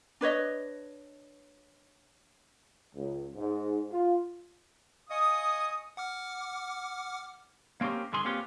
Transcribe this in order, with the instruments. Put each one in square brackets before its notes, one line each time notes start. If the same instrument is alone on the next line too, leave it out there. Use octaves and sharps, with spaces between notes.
[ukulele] D4 B4 C#5 D#5
[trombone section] C#2
G#2
F4
[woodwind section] D#5 F5 G#5 C#6 D#6
[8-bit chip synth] F#5 D6 F6
[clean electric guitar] A#3 C4 C#4 G4 A#4
G2 D3 D#3 G#4 C6
A#3 C4 C#4 F4 G4 B4